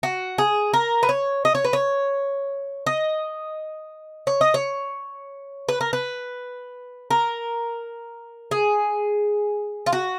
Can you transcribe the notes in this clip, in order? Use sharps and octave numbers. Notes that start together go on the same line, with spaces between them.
F#4
G#4
A#4
B4
C#5
D#5
C#5
B4
C#5
D#5
C#5
D#5
C#5
B4
A#4
B4
A#4
G#4
F4
F#4